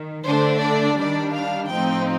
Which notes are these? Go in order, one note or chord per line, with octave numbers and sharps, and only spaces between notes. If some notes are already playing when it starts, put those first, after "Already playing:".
Already playing: D#3
D3 A3 D4 C5
D5
D#3 G3 D4 D5
F5
A2 F3 C4 D#4 G5